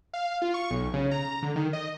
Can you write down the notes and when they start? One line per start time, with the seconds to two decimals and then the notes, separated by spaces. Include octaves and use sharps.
0.14 F5
0.42 F4
0.54 C#6
0.70 B1
0.94 C#3
1.11 A#5
1.42 D3
1.56 D#3
1.73 D#5